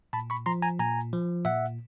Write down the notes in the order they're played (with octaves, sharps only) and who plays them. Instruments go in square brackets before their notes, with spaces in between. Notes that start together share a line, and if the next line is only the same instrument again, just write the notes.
[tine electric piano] A#2 A5 B5
B5 C#6
F3 A#5 C6
G#5 A#5
A#2 G#5 A#5
F3
A#2 E5 F#5